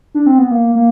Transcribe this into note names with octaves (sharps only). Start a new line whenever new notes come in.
D4
C4
B3
A#3
A#3